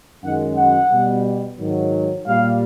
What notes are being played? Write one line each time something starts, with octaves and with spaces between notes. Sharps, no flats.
F#2 D#3 G#3 F#5
F#5
B2 G3
G#2 D#3 F#3
A#2 G3 F5